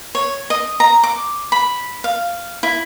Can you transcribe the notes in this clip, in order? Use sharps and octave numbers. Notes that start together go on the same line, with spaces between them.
C#5
D#5
A#5
D6
B5
F5
E4